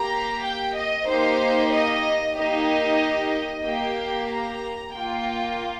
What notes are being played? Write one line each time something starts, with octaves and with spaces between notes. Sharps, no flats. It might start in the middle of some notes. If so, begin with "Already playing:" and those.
Already playing: A#3 G4 A#5
G5
D#5
A#3 D#4 G4 C5
D#5
A#3 D#4 G4 D#5
A#3 G4 G5
A#5
A#3 F4 G5